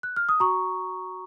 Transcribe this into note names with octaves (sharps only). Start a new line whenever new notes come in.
F#6
F6
D#6
F#4 A#5 C#6